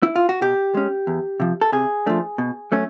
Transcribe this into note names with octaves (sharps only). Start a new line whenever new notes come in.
E4
F4
F#4
B2 G4
G#3 C#4
E2
C3 F3
A4
C3 G#4
F3 A3 D4
B2
F#3 A3 C#4